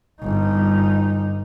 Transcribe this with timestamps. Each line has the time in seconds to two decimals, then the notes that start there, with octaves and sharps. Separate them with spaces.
0.22 G1 D#4